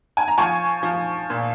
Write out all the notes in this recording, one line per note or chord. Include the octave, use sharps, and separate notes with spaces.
G#5
A#5
F3 G#5 C#6
F3
A#2